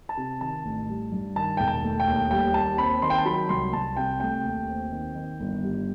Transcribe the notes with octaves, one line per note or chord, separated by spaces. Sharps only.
A5
C3
D#3 A5
A1
G3
G2
D#3 A5
E1 G5
A5
A3
G5
D#2
G3 G5
D#2 A5
C4 B5
D#3 C6
G5
A5
F#3 B5
C2 C6
C2 A5
C3 G5
A3 G5
D#2
C4
D#3
D#3
G1
G3